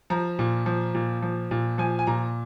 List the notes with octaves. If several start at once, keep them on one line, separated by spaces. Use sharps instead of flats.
F3 A#5
A#2
F3
A#2
F3
A#2
F3 G#5
G#5
A#2 A#5